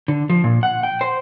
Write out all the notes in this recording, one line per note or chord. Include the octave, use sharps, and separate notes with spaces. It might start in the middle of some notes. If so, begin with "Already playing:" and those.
D3
F3
A#2
F#5
G5
C5